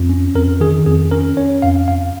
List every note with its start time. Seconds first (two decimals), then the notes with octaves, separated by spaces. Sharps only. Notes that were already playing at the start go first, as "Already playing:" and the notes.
Already playing: F2
0.09 C#4
0.35 F2 A#4
0.60 D#3 G#4
0.86 F2 G#4
1.11 C#4 A#4
1.37 C#4 C#5
1.62 F2 F5
1.88 F2 F5